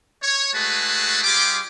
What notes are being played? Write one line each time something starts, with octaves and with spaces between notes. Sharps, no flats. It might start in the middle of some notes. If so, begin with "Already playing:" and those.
C#5
G#3 A3 F#4 G#4 B4 A5
G3 F4 G4 G#4 D6